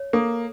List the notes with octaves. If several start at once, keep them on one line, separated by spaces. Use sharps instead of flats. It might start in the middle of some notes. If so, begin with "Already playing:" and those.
Already playing: C#5
A#3 A4